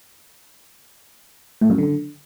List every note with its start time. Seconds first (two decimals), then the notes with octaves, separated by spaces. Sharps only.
1.61 A2
1.70 F#2
1.78 D3